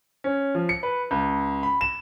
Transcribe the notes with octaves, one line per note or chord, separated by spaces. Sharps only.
C#4
F3
C#7
B4
C#2
B5
E7